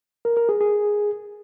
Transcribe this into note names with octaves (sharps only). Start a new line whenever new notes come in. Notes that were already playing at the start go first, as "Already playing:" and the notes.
A#4
A#4
G#4
G#4